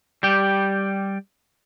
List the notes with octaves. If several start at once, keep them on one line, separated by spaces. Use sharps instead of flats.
G3 G4